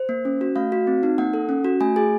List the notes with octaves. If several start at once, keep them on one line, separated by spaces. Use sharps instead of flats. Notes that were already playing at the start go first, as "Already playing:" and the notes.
Already playing: C5
A#3
C#4
F#4
A3 F5
F#4
C4
D#4
A#3 F#5
A4
C#4
F#4
A3 G#5
G#4 G#5